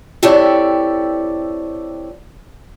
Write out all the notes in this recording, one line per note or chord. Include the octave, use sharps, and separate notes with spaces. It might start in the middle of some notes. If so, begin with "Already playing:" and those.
C4 E4 G4 A4 C#5 D5